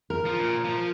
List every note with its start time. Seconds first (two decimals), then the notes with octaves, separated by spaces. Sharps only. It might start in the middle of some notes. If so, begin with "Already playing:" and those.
0.10 A#4
0.25 F3
0.39 A#2
0.64 F3